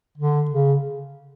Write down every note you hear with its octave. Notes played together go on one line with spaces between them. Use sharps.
D3
C#3